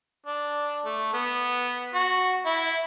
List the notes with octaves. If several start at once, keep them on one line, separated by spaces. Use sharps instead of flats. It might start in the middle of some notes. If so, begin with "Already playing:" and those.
D4
A3
B3
F#4
E4